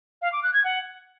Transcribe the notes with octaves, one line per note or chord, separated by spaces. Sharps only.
F5
D6
F#6
G#6
F#5